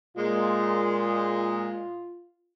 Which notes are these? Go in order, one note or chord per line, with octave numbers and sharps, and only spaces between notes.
A#2 G#3 F4